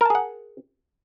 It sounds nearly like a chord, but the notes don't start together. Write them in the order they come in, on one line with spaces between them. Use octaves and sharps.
A#4 A5 G#4 F#5